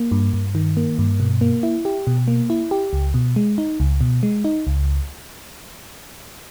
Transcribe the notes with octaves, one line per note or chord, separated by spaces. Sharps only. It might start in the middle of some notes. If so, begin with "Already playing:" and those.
Already playing: A#3
G2
G2
D#3
A#3
G2
B2
A#3
E4
G4
B2
A#3
E4
G4
C#2
B2
G#3
D#4
C#2
B2
G#3
D#4
C#2